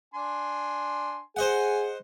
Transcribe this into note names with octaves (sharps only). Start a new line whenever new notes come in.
D4 G#5 C6
G#4 C5 D#5 F#5 G#5